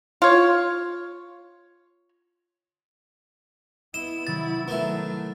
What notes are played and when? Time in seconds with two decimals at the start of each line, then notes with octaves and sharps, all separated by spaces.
0.22 F4 C#5
3.94 B3 E4 D#5 E7
4.27 C3 D#3 F#3 E4 A6
4.68 F#3 A3 B3 E4 A#4 B4 E5